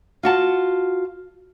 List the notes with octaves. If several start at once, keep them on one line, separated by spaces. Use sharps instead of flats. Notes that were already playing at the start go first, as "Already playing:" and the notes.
F4 F#4 A5